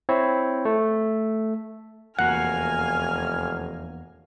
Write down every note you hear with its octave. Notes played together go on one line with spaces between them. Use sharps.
C4 E4 C#5
A3
F1 E2 A#3 F#4 F#5 G#5 F6